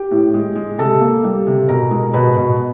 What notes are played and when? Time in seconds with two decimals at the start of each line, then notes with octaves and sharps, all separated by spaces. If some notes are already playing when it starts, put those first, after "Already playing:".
Already playing: G4 G5
0.11 A2
0.34 G#3
0.55 G#3
0.78 C3 A4 A5
1.01 A#3
1.24 G3
1.47 C3
1.68 B2 A#4 A#5
1.91 G#3
2.14 B2 B4 B5
2.37 B2